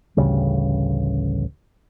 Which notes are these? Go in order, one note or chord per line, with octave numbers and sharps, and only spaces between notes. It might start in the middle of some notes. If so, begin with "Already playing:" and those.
A1 D2 C#3 G3